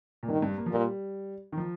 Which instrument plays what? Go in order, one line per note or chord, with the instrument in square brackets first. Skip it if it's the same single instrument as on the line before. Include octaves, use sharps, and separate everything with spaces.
[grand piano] A#2
[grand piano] G2 [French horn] D#3
[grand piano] G2
A#3
F3
[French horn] A#2 [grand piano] G3
[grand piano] D#3
F3